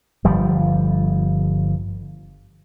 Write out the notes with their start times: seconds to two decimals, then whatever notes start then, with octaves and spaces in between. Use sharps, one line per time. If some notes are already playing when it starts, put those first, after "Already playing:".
0.24 G1 F3 G3